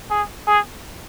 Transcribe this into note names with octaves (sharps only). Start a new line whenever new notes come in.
G#4
G#4